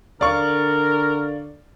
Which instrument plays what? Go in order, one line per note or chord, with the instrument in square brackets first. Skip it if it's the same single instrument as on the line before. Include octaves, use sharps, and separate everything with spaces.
[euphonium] D3 [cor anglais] A#4 [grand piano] D5 F5 C#6